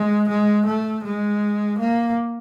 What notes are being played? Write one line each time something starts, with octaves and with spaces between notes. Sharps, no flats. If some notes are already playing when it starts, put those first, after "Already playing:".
Already playing: G#3
G#3
A3
G#3
A#3